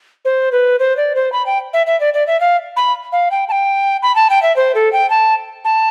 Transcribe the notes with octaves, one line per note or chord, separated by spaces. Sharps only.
C5
B4
C5
D5
C5
B5
G5
E5
E5
D5
D5
E5
F5
B5
F5
G5
A5
G5
B5
A5
G5
E5
C5
A4
G5
A5
A5